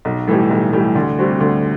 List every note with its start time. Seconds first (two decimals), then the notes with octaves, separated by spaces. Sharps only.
0.05 B1
0.28 A2 E3 G3
0.51 B1
0.73 A2 E3 G3
0.95 D2
1.18 C3 G3 C4 F#4
1.40 D2